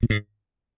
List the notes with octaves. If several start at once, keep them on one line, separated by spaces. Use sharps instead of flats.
A#2
G#2